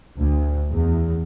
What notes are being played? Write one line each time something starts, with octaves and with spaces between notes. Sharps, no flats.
D2
E2